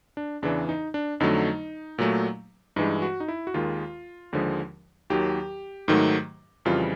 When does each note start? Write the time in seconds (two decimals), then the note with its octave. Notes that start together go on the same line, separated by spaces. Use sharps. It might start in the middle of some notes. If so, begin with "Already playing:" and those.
0.17 D4
0.42 E2 C#3 E3 D4
0.69 D#4
0.94 D4
1.20 F2 D3 F#3 A3 D#4
1.98 A#2 F#3 A3
2.76 G2 E3 G#3 D#4
3.02 F#4
3.20 D#4
3.28 E4
3.47 F#4
3.54 D#2 D#3 G#3 F4
4.33 D#2 D3 F3 G#3
5.10 D#2 D#3 F#3 G4
5.88 G#2 D#3 F#3 A3
6.65 F2 C#3 E3 G3 F4